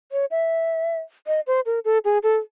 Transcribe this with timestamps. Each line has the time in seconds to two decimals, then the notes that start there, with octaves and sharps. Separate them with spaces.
0.12 C#5
0.31 E5
1.27 D#5
1.47 C5
1.66 A#4
1.85 A4
2.05 G#4
2.23 A4